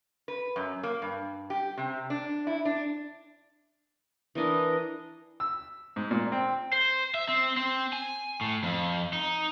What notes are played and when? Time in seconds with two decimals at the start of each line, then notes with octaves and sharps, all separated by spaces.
0.28 B4
0.56 F#2
0.83 A#3
1.02 G2
1.50 G4
1.78 C3
2.10 D4
2.47 E4
2.65 D4
4.35 E3 D4 A#4 D#5
5.40 E6
5.96 G#2
6.11 A#2
6.32 C4
6.73 C5
7.14 E5
7.28 C4
7.57 C4
7.93 G#5
8.41 A2
8.63 F2
9.13 D#4